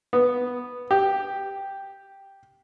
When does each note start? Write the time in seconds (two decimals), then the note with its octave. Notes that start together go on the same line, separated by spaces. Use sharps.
0.13 B3
0.91 G4